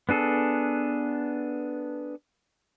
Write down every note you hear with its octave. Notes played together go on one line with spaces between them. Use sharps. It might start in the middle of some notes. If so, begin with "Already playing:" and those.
B3 D4 G#4 A4